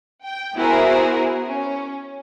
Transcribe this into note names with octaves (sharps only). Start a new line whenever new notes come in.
G5
B3 E4 F#4 G#4 A#4 C5
C#4